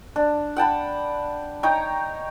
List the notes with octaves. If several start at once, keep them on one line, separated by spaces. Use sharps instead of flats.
D4
F#5 G5 A5 B5
D#4 C#5 G5 A#5